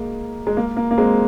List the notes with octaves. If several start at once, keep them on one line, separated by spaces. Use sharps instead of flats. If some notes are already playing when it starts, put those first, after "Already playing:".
Already playing: G#3 A#3
G#3
A#3
A#3
A#3
G#3 C4